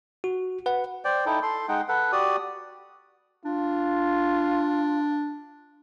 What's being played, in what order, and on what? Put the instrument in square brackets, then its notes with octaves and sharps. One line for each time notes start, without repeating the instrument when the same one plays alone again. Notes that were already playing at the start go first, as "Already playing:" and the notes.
[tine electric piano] F#4
B4 F#5
[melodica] C5 D5 G5
D#4 E4 A4 G5
A4 C6
G#3 D#4 F#5 G5
A4 B4 F#5
F#4 G4 D5 D#6
[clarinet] D4 [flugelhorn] F4